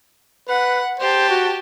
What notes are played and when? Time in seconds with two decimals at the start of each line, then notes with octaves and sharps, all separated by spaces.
0.49 B4 F#5
1.00 G4 C5 A5
1.30 F#4